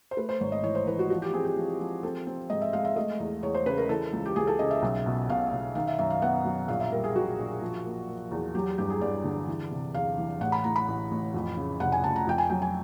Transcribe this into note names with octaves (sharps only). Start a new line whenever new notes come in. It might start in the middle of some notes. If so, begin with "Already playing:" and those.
C5
A3 B4
C5
G#1 C#5
D#5
E3 C#5
C5
E3 B4
F#4
F3 F#4
G4
C4 G#4
G4
F3
F3
C4 A4
C4
G#2 D#5
E5
G#3 F5
E5
A3 D#5
E2
E2 C#5
C5
C#3 B4
A#4
E3 A4
C#2
G4
C#2 G#4
A4
C#3 D#5
E5
B1
B2
B2 F5
B2
D#3 F5
E5
F#2 E5
F5
B3 F#5
F#3
A#1 F5
E5
G3 A#4
G#4
A#1 F#4
A#1
F3
A#3
A#3
E2
F#3 G4
G2 G4
G#4
G2 D5
D3
E3
C3
E2 F5
E3
A1 F#5
B5
A2 A#5
B5
A1
A1
F2
C#3
F1 F#5
G#5
F1 A5
A#5
F2 G5
G#5
F#3 G5
G#5